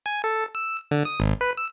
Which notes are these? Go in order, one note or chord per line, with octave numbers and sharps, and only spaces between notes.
G#5
A4
E6
D3
D#6
G#1
B4
E6